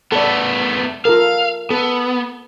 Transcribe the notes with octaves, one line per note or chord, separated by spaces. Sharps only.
A3 B3 A4 D5
F4 A4 A#4 F5
B3 A4